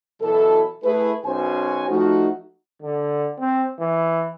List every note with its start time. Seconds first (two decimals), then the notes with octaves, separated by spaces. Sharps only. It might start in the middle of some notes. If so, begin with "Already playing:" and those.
0.21 B2 E3 F#3 E4 A4
0.83 A3 E4 G#4 B4
1.25 B1 C#4 F#4 C5 G#5
1.88 F3 A3 D#4 F#4
2.82 D3
3.40 C4
3.80 E3